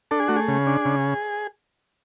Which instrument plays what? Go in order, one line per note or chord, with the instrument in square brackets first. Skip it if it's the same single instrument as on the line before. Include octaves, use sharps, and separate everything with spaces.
[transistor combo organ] D4 A4
G#4
A3 F#4
G#4
C#3
D4
C#3